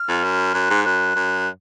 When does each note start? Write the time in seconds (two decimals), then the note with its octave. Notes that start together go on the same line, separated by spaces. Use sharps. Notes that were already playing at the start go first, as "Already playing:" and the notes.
Already playing: F6
0.08 F2
0.24 F#2
0.54 F#2 F#6
0.70 G#2
0.85 F#2 F#6
1.16 F#2